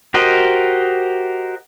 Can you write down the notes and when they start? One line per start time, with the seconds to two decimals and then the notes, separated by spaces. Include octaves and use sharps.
0.14 F#4 G4 A#4 C5 D#5